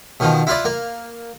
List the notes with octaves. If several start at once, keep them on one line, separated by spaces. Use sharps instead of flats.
B2 D#3 F3
E4 F4 B4 D5
A#3